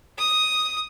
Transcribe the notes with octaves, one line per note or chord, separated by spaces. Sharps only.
D#6